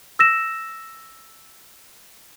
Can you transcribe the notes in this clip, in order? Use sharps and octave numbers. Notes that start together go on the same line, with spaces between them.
E6 A#6 E7